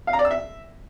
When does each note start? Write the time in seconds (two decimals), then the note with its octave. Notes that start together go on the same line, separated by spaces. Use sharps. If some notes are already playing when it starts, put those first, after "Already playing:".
0.07 F5
0.13 A#5
0.19 D5
0.25 E6
0.31 E5